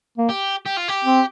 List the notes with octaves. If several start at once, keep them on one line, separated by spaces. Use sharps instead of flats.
A#3
G4
G4
F4
G4
C4